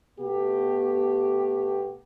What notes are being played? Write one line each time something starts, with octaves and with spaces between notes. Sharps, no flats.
B2 A3 B3 G4